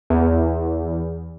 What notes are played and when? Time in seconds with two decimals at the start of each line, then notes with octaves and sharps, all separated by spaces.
0.10 E2